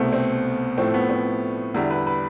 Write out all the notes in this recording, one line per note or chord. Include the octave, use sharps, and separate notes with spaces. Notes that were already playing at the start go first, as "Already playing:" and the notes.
Already playing: C2 B2 A3 C4
C4
A2 F3 A3 C4
B3
C4
E2 D3 G3 E4
B4
B4